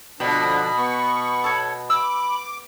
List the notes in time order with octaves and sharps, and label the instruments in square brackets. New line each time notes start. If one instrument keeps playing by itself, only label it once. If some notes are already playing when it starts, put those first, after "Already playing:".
[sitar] B2 [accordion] D3 F3 D4 [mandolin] G5 [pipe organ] B5
[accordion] B3 C#6
[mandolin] A4 C#5
[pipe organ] B5 [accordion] D6 [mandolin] E6